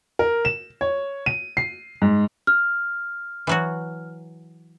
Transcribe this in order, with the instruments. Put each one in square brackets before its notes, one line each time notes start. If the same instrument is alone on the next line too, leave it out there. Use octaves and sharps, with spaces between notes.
[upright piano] A#4
E7
C#5
D#7
C7
G#2
[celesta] F6
[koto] E3 F#3 F#4